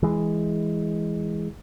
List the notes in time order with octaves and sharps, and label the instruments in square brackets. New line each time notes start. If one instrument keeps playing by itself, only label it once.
[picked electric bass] E3 G#3